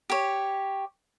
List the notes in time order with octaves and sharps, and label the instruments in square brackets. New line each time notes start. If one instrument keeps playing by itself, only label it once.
[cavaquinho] G4 C#5